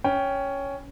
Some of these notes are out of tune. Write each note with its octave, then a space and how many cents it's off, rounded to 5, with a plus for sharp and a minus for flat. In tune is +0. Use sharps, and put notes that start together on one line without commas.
C#4 +5 G5 +0